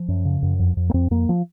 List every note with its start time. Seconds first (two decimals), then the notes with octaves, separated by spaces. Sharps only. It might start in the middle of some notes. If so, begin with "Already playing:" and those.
Already playing: F3
0.08 F#2
0.25 C#3
0.42 F#2
0.59 F2
0.77 F2
0.90 A#3
0.94 F2 C4
1.11 F2 A#3
1.29 F3